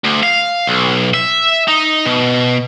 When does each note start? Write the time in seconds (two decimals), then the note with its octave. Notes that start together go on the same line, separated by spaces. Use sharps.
0.04 D2
0.23 F5
0.67 B1
1.14 E5
1.68 D#4
2.05 B2